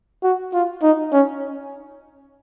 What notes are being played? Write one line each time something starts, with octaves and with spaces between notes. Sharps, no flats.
F#4
F4
D#4
C#4